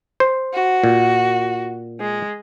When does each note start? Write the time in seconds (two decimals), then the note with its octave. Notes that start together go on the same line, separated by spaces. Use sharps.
0.20 C5
0.54 F#4
0.84 A#2
2.01 G#3